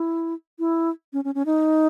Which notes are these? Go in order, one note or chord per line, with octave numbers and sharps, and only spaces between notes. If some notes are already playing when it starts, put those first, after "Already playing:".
Already playing: E4
E4
C#4
C#4
C#4
D#4